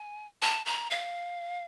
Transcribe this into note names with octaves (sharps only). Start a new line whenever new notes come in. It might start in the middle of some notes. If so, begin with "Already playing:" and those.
Already playing: G#5
A5
A#5
F5